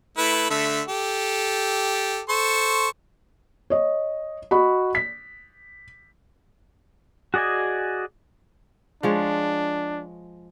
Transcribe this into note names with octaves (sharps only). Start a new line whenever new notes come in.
A3 E4 B4
D3 A3 E5
G4 A4
A4 C5 C#6
C#5 D#5
F#4 D#5 B5
B6
F#4 G#4 D5 D#5 G#5
F3 G#3 D4 C#5